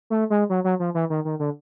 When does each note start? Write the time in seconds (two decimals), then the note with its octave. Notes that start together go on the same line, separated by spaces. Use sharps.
0.10 A3
0.30 G#3
0.50 F#3
0.64 F#3
0.80 F3
0.94 E3
1.10 D#3
1.25 D#3
1.39 D3